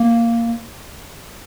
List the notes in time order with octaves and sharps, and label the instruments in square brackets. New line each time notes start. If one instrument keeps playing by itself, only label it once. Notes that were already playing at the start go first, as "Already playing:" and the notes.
Already playing: [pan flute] A#3